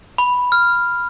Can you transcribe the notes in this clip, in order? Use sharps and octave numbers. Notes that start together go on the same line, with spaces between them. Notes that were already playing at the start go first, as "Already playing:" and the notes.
B5
F6